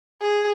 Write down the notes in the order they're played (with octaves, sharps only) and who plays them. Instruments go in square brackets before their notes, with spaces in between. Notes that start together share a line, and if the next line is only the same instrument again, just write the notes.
[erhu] G#4